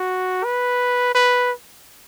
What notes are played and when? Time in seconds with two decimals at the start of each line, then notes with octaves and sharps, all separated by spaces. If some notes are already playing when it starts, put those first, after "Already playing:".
Already playing: F#4
0.44 B4
1.15 B4